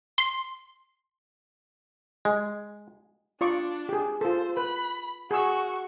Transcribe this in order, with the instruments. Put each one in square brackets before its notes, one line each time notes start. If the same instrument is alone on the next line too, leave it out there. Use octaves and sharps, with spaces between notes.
[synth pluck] C6
[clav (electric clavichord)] G#3
[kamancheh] D4 [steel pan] F4 D5 C#6
[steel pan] G4 G#4
[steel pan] F4 A4 [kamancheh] C5
[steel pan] B4 [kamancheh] B5
[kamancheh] F#4 C#6 [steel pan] G#4 E6